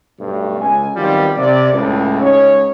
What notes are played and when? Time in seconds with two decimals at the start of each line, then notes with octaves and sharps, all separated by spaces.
0.18 B1 G2 A3
0.58 C#2 G#5
0.96 D#3 F#3 G3 B3 C4 F4
1.37 C3 D5
1.71 C#2 A2
2.20 C#2 C#4 D#4 C#5